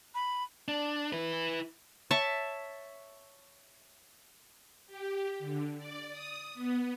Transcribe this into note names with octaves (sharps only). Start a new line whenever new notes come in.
B5
D4
E4 B4
C#5 E5 A5
G4
D3
D5
D#6
B3